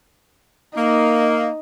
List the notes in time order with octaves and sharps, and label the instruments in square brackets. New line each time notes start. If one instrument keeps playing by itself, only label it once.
[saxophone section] A#3 [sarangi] D#4